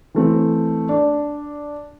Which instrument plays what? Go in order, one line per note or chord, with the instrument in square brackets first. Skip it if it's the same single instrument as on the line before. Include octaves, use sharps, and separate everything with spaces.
[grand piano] E3 A3 C4
D4